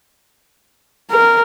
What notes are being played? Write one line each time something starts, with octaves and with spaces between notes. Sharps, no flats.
A#4